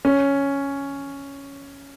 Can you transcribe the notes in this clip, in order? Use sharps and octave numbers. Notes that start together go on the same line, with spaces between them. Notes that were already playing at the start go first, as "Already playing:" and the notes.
C#4